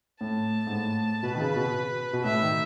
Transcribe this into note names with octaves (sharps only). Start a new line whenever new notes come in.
A2 A5
G#2
A2
B2 B4
D#3
C#3
B2
B2
A2 E5
D#3